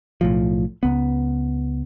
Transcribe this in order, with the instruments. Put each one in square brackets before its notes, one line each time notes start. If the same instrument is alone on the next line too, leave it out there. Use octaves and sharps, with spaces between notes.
[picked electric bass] B1 A2 F3
C#2 B3